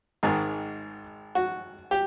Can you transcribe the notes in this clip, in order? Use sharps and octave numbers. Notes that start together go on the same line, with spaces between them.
G#1 G#2 D#3 G#4
F#4
G4